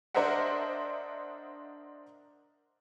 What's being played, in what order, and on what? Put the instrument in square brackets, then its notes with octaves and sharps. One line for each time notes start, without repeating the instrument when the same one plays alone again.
[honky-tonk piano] D4 A#4 C5 D#5 E5 F#5